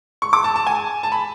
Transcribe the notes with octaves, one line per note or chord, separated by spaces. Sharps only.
C#6
D6
A5
A5
G#5
A5
B5